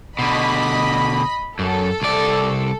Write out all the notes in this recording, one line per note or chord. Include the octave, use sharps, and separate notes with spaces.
B2 D3 D#5 B5
F#2 A4
C2 D5